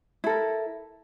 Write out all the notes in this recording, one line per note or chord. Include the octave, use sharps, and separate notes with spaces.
E4 A4 A#4